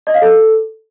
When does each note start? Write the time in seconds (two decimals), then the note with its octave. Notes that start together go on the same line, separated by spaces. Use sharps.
0.07 D#5
0.14 F5
0.22 A4